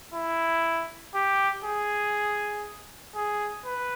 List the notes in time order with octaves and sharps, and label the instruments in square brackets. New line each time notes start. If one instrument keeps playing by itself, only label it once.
[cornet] E4
G4
G#4
G#4
B4